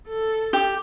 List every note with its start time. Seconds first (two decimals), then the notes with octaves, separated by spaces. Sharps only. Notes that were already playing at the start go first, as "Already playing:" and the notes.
0.08 A4
0.53 G4